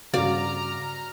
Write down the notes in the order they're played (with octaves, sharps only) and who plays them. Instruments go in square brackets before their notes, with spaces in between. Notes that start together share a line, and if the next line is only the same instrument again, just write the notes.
[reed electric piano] G2 C#3 [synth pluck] F#4 F5 [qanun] D5 [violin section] A#5 F6